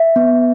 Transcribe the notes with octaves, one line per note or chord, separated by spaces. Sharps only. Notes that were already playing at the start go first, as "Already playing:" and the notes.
Already playing: E5
B3